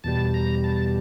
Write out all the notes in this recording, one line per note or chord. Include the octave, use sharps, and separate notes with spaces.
E2 B2 G3 A5
A#5
A5